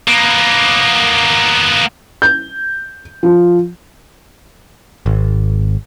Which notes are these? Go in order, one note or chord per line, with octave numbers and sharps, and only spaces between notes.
A#3 B3
G6
F3
G#1